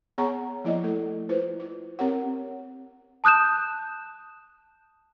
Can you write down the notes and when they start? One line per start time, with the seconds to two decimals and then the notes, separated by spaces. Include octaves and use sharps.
0.18 B3 G#4 C#5 F#5 A#5 C#6
0.65 F3 A#3 E4 D5 D#5
0.84 A3 A4
1.29 E4 F4 B4 C5
1.60 F4
1.99 C4 G4 A#4 C#5 F#5
3.24 A5 D#6 F#6 G6 E7